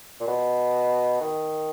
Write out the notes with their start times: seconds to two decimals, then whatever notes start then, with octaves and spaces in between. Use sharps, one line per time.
0.21 A#2
0.28 B2
1.21 D#3